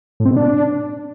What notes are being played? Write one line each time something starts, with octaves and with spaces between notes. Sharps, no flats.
A2
C4
B2
D4